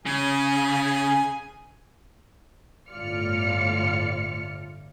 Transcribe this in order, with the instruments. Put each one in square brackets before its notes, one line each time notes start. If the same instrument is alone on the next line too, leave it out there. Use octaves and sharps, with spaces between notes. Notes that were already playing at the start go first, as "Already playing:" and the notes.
[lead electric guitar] C#3 [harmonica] G#4 G#5
[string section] G1 A2 F4 D5 F6 C#7